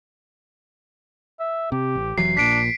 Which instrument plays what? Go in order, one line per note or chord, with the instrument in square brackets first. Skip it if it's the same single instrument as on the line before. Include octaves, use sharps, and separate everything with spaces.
[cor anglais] E5
[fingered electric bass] C3 [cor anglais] G4
[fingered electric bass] A1
[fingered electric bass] F1 E3 F#3 [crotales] C7
[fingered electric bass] A#1 A#2 [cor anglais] D4 [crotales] B6 D7